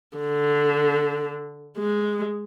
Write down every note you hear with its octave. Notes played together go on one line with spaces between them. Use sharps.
D3
G#3